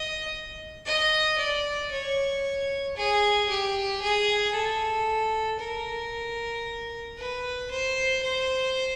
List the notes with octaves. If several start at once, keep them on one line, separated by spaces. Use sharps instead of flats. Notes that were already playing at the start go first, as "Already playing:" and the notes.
Already playing: D#5
D#5
D5
C#5
G#4
G4
G#4
A4
A#4
B4
C5
C5